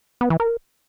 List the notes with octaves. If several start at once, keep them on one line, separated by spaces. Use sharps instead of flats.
B3
E3
A#4